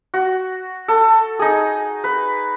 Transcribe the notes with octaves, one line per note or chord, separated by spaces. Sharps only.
F#4
A4
D#4 G#4
B4